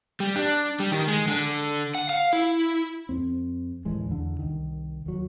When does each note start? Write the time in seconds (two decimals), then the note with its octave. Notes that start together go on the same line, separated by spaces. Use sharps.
0.20 G3
0.36 D4
0.80 G3
0.91 D#3
1.08 G#3
1.28 D3
1.95 F#5
2.09 F5
2.33 E4
3.09 F2 C4
3.85 A1 D#2 E3 G#3
4.10 E2 D3
4.39 C2 D#3
5.06 D#2 F#3